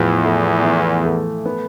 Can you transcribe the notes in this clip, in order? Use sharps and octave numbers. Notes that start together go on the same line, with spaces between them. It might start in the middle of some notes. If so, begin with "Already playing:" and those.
Already playing: E2 A2 F3
A3
E3
A3
B3